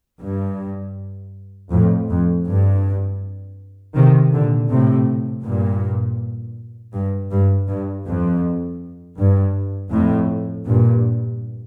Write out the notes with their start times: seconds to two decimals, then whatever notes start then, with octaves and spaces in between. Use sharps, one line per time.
0.23 G2
1.71 F2 A2
2.09 F2
2.47 G2
3.95 C3 D#3
4.32 A#2 D3
4.70 A2 C3
5.44 G2 A#2
6.94 G2
7.31 G2
7.68 G2
8.06 F2
9.18 G2
9.92 F2 A2
10.66 G2 A#2